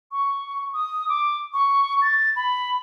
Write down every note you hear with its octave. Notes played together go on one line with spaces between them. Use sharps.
C#6
D#6
D6
C#6
A6
B5